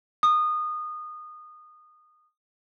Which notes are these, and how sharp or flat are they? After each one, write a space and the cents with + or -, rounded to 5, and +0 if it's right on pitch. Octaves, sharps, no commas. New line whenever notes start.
D#6 -25